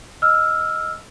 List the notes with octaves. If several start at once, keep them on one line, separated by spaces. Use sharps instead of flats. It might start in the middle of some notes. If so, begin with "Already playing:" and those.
D#5 E6 F6